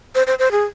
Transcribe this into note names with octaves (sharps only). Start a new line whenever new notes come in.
C5
C5
C5
G#4